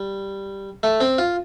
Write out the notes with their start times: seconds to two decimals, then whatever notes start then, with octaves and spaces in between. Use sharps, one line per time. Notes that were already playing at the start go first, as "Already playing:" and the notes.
Already playing: G3
0.83 A3
1.00 C4
1.18 F4